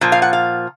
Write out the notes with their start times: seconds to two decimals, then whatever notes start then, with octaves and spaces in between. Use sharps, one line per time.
0.01 A#2 F3
0.12 F5
0.22 F#5
0.33 F5